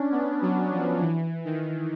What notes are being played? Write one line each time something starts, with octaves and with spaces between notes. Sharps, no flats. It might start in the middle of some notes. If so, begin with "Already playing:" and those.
Already playing: C#4 D4
B3
F#3
F3
E3
D#3